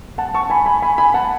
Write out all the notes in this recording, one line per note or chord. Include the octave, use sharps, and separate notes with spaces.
F#5 A5
A5 C#6
G#5 B5
G#5 B5
G#5 B5
G#5 B5
F#5 A5